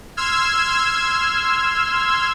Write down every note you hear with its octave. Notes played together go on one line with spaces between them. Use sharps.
C6 E6 F6 G#6